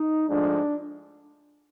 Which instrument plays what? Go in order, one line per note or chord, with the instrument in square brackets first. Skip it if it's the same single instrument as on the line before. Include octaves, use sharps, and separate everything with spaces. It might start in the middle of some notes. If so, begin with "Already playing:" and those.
Already playing: [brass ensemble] D#4
G#2 F3 A3 D4